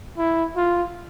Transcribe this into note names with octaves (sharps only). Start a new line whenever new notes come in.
E4
F4